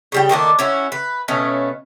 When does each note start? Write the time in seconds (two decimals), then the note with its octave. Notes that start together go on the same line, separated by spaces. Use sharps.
0.12 C#3 G3 G5
0.29 D#3 A3 A#3 D4
0.59 C#4 E4 F#4
0.92 B4
1.28 B2 A3 C#4 F5